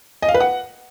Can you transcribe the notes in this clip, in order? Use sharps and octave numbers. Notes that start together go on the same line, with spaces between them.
D#5
F5
B4
F#5